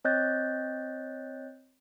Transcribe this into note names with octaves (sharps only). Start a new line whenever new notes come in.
C4 C#5 D#5 F#6 G6 A6